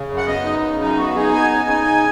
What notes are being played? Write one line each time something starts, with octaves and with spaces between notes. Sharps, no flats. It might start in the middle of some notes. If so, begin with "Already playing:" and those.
Already playing: C#3
F#2
F#5
B3 D#5
D#4
C#3
F#2 D#4
B3 F#4
D#4 G#4
B3 G#5
C#3
D#4
C#3